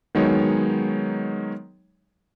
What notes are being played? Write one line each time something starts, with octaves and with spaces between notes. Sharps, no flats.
D#3 F#3 G#3 B3 D#4 C#5